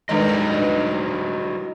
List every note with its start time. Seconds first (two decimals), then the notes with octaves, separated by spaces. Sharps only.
0.09 G2 D#3 F#3 G#3 E4 A4 B4 D#5
0.57 D#4 B4